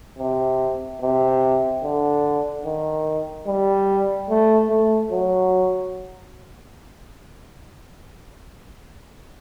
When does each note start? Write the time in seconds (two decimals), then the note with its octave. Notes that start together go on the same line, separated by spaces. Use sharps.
0.19 C3
1.02 C3
1.83 D3
2.66 D#3
3.47 G3
4.30 A3
4.69 A3
5.11 F#3